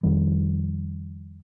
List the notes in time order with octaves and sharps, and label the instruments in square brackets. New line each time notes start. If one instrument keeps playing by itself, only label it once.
[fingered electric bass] F2 D#3 G3